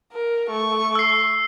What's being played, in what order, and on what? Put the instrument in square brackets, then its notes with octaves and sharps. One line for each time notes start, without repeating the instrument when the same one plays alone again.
[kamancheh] A#4
A3 C#6
[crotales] E6 C7